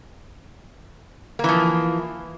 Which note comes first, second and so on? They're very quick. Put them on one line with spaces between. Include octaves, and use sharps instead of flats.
A#3 E3 F3